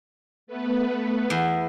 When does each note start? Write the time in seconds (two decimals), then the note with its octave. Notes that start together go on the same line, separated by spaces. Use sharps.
0.47 A3 B3 B4
1.30 E2